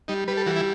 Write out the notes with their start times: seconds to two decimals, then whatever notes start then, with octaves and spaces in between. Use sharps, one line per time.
0.08 G3 D#4
0.28 G3 B4
0.37 A4
0.46 E3 F#4
0.56 E4